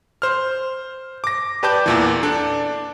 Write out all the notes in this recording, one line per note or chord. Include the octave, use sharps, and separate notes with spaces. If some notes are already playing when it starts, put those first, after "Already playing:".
C5 F6
D6 A#6
G4 B4 D5 A5 D6 G6
E2 A#2 E3
D4 A4 D5